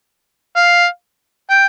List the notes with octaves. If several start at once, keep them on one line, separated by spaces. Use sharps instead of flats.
F5
G5